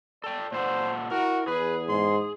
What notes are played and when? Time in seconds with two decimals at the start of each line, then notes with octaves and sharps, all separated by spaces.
0.24 A4 D5 G5
0.52 A#2 A4 C5 F#5
1.11 E4 F#4 A#4
1.47 E2 G#4 B4
1.89 G#2 C6